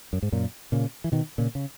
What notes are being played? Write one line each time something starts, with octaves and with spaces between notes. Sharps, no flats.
F#2
G#2
F#2 A#2
A#2 C#3
E3
B2 D#3
A#2 C#3
C#3